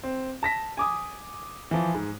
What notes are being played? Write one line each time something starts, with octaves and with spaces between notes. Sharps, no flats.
C4
A5 A#6 B6
G#5 D6 D#6
E3 F3
G#2